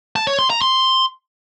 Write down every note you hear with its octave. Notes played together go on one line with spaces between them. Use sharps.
A5
C#5
C6
A#5
C6